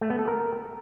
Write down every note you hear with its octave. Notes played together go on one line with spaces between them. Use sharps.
A3
B3
A4
A#4